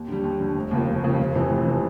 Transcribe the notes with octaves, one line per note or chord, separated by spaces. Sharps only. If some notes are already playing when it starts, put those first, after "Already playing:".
Already playing: D#2
D3 G3
D#2
D3 G3
F1
D#2 C#3 F3 A#3
F1
D#2 C#3 F3 A#3
F1
F2 C3 E3
F1
C3 E3